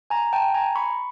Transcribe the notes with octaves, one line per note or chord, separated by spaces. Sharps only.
G#5 A#5
G5 A5
G#5 A#5
B5 C#6